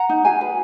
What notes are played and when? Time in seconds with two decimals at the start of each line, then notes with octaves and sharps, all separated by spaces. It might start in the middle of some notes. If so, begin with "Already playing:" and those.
Already playing: F#5 A#5
0.09 D#4
0.25 F#4 F5 G#5
0.41 B4